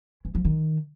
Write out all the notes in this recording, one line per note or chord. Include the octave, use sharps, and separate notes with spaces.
E3
F3
D#3